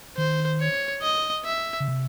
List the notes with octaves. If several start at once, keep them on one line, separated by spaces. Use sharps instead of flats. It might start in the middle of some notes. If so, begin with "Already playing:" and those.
D#3 C5
C#5
D#5
E5
C#3
C3